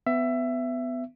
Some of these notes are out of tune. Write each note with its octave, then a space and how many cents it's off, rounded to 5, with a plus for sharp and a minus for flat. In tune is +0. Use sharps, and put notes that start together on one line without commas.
B3 +25 E5 +20